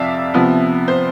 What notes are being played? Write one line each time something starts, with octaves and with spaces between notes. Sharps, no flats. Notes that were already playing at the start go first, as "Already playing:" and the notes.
Already playing: F2 C3 F3 C4 D5 E5 F5
C3 F3 B3
C5